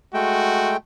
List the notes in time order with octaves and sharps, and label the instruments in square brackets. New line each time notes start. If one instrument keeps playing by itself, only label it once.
[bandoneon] G#3 A3 G5 [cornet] F#4